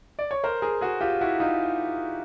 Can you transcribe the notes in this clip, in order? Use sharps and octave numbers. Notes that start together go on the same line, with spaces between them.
D5
C#5
A#4 C5
G#4 A#4
F#4 G#4
F4 G4
E4 F#4
D#4 F4